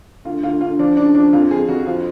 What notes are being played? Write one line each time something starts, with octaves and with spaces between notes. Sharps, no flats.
D2 F4
D2 F4
D2 F4
F3 D4
C#3 D4
F3 D4
F2 F4
F2 G#4
F2 F#4
F3 F4